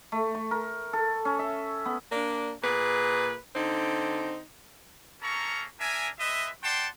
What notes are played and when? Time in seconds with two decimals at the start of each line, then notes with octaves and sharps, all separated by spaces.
0.12 A3
0.35 C#6
0.51 A#4
0.93 A4
1.25 C#4
1.39 E5
1.86 B3
2.12 A#3 D4
2.63 A#2 G#4 B4
3.55 D3 C4 D#4
5.21 A#3 C#4 A4 A#4 A#5 C#6
5.80 D4 A#4 E5 G#5
6.18 G#3 B4 D#5 E5
6.63 D5 F#5 G5 A5 C6